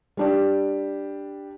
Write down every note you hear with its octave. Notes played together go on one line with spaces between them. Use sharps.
G3 D4 G4